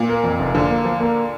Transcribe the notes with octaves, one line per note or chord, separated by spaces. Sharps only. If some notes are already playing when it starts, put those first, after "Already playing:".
Already playing: A#2
A#3
F2
F1
D3 F3
A#3
F3
A#3